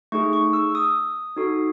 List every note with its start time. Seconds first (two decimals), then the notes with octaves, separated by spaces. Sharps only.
0.12 A3 D#4 G#4 C#6
0.33 C#6
0.53 E6
0.75 D#6
1.36 D#4 F#4 A4